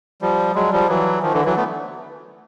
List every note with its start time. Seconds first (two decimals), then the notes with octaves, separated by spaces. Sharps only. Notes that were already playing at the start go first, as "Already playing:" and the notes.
0.22 F3 G3
0.55 F#3 G#3
0.72 F3 G3
0.88 E3 F#3
1.22 D#3 F3
1.33 D3 E3
1.45 E3 F#3
1.56 A3 B3